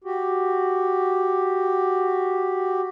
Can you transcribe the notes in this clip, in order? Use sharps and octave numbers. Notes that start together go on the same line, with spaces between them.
F#4 G4